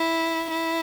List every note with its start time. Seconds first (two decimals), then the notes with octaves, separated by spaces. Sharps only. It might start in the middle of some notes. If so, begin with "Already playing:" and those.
Already playing: E4
0.51 E4